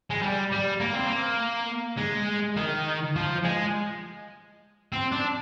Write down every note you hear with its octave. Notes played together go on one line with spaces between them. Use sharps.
G#3
G3
G3
A#3
C4
A#3
G#3
D#3
F3
G#3
C4
D4